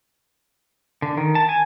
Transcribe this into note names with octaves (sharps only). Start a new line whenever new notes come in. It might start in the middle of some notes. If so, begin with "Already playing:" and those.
D3
D#3
A5
G#5